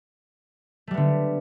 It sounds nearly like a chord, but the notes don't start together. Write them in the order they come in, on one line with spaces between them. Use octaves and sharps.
A3 G3 B3 D3